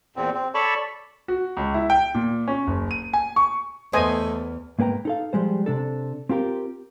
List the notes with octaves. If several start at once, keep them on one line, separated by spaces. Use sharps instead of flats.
E2 A#2 C4
C4
A4 C#5 D5 A5 B5 C#6
F#4
C#2
E4
G5
A#2
C#4
F#1
D#7
G#5
C#6
E2 A3 B3 C5 D#5 G#5
G#2 A#3 B4 G5 A#5
D#4 A4 F5
F3 G3 G#3 C5
C3 D4 A4
C4 F4 G4 A#4